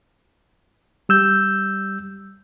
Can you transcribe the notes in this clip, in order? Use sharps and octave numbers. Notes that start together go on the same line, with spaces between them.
G3 E6 G6